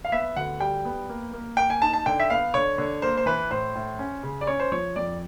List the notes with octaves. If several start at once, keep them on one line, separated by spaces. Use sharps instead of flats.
F5
B3 E5
D2 F#5
G3 G5
B3
A#3
A#3
A#3 G5
G#5
D#4 A5
A5
D3 G5
E5
B3 F5
D3 C#5
D3
A#3 C5
C5
E3 B4
A2 C5
A2
C#4
C#3
D5
C#4 C#5
C5
F3 C#5
F2 D5